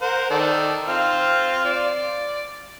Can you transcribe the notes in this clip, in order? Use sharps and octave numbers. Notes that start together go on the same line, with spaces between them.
A#4 C5 F#5
D#3 A4 D5
C4 F4 F6
D5